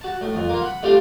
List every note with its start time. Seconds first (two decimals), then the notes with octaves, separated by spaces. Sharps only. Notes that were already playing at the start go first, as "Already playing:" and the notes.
0.01 F#4 A5
0.21 A2
0.35 F2
0.49 A#3 F4
0.62 F#5 B5
0.83 A3 C4 D4 F4 G4